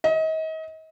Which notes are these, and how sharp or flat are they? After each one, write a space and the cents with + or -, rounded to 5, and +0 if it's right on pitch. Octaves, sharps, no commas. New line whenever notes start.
D#5 +35